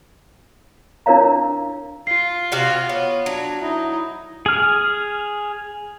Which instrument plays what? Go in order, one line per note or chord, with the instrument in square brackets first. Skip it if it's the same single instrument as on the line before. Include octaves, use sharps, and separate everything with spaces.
[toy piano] D4 E4 A#4 C#5 F5 A#5
[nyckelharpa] F4 [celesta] C7
[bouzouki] C3 F#4 F5
[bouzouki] B3 [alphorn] C#5
[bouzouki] F#3 [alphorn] D4
[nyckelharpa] D#4 [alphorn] E4
[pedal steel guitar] G#4 F6